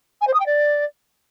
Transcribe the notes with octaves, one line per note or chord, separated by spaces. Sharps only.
G#5
C5
D#6
G5
D5